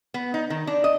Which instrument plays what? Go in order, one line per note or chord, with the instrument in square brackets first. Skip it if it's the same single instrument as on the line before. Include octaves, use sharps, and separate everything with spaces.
[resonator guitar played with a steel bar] B3
D#4
D#3
D4
D#5